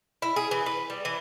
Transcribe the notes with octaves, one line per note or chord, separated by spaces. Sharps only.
E4
G#4
E3
B4
G3
E3